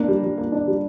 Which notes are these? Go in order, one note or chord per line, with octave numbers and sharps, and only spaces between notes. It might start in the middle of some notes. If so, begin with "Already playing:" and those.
Already playing: A#3 D4
G3
G3
A#3
D4
G3